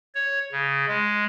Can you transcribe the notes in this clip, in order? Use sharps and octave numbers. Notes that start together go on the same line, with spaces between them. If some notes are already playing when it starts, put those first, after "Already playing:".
C#5
C#3
G#3